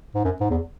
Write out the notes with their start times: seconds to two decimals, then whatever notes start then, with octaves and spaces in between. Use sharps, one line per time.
0.15 G#2
0.24 F#2
0.41 G#2
0.50 E2